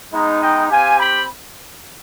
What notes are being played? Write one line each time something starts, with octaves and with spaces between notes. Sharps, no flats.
G#3 B3 D#4
D#5 G5
C4 G4 F5 G#5
G5 B5